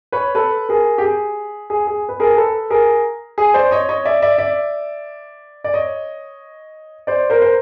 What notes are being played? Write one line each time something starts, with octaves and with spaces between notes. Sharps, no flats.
B4 C#5
A4 B4
G#4 A#4
G4
G#4
G#4
G#4
B4
G#4 A#4
A4 B4
G#4 A#4
G#4
C5 D5
C#5 D#5
C#5 D#5
D5 E5
D5 E5
D5 E5
D5
C#5 D#5
C5 D5
A#4 C5
C5